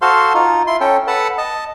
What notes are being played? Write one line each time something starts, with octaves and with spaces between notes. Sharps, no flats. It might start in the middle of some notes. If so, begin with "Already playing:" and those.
F#4 A4 C5 F5 C6
D#4 F4
E4 C6
C#4 A4 G5
A4 B4 F#5 A5
D#5 A5